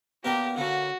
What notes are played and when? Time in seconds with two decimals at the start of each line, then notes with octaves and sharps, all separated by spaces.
0.24 B2 A#3 D4 G4 A#4
0.56 D3 A#3 C#4 F#4